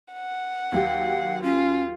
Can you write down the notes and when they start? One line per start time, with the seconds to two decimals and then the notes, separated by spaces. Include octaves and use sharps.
0.13 F#5
0.72 D#2 F#3 G4 F5
1.43 C#4 F4